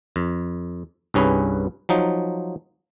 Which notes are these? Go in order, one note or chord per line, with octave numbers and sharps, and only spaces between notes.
F2
C2 G2 C#4 G#4 B4
F3 F#3 D#4